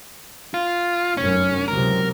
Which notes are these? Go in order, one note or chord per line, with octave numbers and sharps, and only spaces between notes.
F4
F1 F#2 C#4
C#2 C3 F#3 A#4